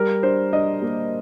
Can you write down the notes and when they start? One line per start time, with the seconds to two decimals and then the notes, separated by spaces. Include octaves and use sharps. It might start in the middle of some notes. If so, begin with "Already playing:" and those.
Already playing: G3 A#4
0.23 D4 C5
0.53 D4 D#5
0.82 A#3